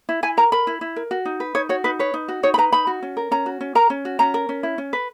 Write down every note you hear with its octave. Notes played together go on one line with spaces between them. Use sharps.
E4
E4 G#5
A#4 A#5
A#4 B5
E4
E4
A#4
F#4
D#4
B4
D#4 C#5
F#4 C#5
D#4 B4
B4 C#5
D#4
F#4
D#4 C#5
B5
B4 A#5
D#4 B5
F#4
C#4
A#4
C#4 A#5
F#4
C#4
A#4 A#5
C#4
F#4
C#4 A#5
A#4
C#4
E4
C#4
B4